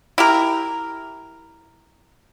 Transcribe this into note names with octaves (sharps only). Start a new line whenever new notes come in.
E4 G4 A#4